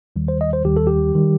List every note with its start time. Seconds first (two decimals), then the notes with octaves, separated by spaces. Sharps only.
0.16 D#2 D#3 G3
0.28 C5
0.41 D#5
0.53 C5
0.65 D#2 D#3 G3 G4
0.77 A4
0.87 G4
1.15 D#3 G3